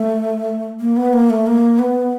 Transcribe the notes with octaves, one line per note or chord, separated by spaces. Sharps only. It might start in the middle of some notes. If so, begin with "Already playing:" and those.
Already playing: A3
A#3
B3
A#3
A3
A#3
B3